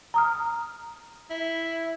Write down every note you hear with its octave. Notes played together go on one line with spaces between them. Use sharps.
A#5 D#6 F6
E4